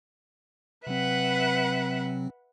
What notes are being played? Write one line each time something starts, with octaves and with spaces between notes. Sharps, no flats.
C3 F#3 C4 B4 E5 F#5